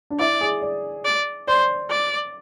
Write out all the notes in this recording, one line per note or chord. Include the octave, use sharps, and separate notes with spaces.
D4
E4 D5
G#4
D5
D5
C5 D5
D5